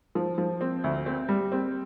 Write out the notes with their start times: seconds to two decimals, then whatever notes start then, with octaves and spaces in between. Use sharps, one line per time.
0.15 F3
0.38 F3
0.61 C4
0.84 D2
1.06 C4
1.29 G3
1.52 C4